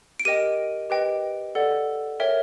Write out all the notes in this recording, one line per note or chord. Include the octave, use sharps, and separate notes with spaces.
D7
G4 A#4 D#5 G5 D#7
G4 B4 D#5 G5
A4 D5 F#5
A#4 C#5 E5 G5